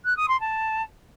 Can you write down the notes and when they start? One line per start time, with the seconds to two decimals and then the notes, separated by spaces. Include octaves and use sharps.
0.05 F#6
0.16 D#6
0.28 C6
0.40 A5